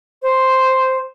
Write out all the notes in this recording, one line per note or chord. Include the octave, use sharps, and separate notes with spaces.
C5